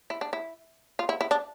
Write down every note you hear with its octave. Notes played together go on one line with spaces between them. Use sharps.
E4
D4
E4
F4
E4
E4
D4